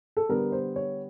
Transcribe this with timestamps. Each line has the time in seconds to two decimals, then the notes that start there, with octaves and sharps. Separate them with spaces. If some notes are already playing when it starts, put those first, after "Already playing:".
0.17 A4
0.29 D3 G3 B3 A#4
0.52 C5
0.76 C#5